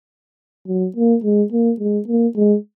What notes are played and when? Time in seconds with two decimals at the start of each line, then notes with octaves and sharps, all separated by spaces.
0.68 F#3
0.96 A#3
1.24 G#3
1.52 A#3
1.80 G#3
2.08 A#3
2.36 G#3